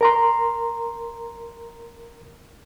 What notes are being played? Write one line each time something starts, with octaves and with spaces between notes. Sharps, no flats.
A#4 A#5 C6